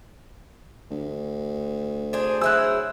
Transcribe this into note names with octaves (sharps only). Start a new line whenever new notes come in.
D2
D4 G#4 C5
F#3 E4 G#4 E6 F#6